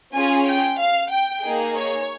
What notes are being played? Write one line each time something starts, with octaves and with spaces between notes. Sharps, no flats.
C#4 F4 G#4 G#5
G5
F5
G5
A#3 D#4 G#4
C#5